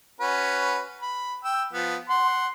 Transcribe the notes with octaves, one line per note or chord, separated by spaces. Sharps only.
C#4 F#4 B4
B5
G5 E6
F3 B3
F#5 C6